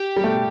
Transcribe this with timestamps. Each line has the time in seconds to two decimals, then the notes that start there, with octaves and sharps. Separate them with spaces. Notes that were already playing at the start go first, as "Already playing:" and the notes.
Already playing: G4
0.16 G3
0.24 A3